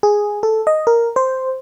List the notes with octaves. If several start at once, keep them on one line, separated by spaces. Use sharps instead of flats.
G#4
A4
D#5
A#4
C5